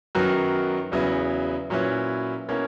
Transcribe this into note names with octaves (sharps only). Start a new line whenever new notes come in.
F#2 D#3 F#3 B3 F#4
E2 C#3 F#3 B3 E4
A#2 F#3 C#4 E4 B4
B2 A#3 C#4 E4